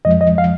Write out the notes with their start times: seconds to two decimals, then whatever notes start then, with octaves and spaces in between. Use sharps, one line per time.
0.05 F2 F3 G#3 D#5
0.21 D#5
0.38 F5